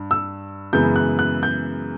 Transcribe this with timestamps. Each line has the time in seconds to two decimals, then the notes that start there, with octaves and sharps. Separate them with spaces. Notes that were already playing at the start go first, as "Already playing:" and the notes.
Already playing: G2
0.11 E6
0.73 F#2 C#3 E3 G#3 B3 G6
0.96 F#6
1.19 F#6
1.43 G6